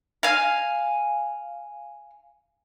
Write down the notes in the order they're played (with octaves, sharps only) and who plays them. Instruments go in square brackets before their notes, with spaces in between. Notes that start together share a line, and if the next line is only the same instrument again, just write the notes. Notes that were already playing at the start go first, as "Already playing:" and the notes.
[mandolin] F5 G#5